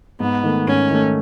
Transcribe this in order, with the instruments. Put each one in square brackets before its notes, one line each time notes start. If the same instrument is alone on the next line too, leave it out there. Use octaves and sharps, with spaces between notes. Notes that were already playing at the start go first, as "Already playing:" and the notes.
[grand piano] G#2 [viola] B3
[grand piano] D#3 A3
[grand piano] G#2 [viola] C#4
[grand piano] D#3 A3